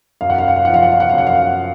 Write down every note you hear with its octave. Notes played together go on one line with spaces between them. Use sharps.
F#2 F5
F#5
F5
F#5
F5
F3 F#5
F5
F#5
F5
F#5
F#2 F5
F#5
F5